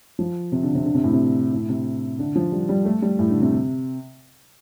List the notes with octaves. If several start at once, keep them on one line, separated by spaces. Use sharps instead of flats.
F3
C3
D3
C3
D3
C3
A2
C3
A2
C3
D3
F3
G3
G3
A3
G3
A2
D3
C3